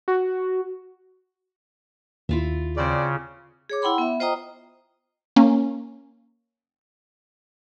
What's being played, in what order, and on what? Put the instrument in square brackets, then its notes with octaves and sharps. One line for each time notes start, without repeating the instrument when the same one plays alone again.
[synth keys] F#4
[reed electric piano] D#2 [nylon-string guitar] E4 F4 E5
[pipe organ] C#3 [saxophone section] C4 D5
[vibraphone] G#4 C#5 D6
E4 F#5 G5 B5 C6
B3 E5
F4 C5 D#5 G5 A#5 D#6
[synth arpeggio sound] A#3 C#4